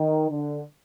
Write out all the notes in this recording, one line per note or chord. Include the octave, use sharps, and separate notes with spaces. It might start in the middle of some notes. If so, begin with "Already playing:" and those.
Already playing: D#3
D3